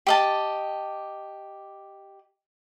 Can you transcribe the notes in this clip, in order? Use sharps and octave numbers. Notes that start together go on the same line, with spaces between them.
G4 D#5 A5